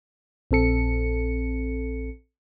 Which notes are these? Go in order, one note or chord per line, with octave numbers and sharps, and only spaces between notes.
A#1 C4 A4 C#7